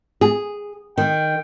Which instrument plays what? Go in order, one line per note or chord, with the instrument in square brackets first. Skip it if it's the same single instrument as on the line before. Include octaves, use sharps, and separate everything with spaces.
[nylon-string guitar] G#4
[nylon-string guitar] D#3 [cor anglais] G5